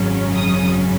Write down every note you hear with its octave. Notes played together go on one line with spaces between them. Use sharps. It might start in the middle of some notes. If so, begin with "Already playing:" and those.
Already playing: G#1 F#2 C#3 F#3 C#4
D#6